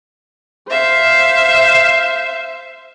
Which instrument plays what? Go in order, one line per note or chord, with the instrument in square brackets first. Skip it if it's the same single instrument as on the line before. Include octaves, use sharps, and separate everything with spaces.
[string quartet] C5 E5 F5